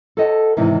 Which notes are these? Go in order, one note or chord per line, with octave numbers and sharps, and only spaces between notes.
A4 C5 C#5 D#5 F#5 A5
E2 G#2 C3 D#3 E3